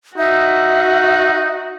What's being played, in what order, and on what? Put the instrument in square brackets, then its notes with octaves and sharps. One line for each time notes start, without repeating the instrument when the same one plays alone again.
[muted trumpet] D#4 [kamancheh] F#4 [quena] E5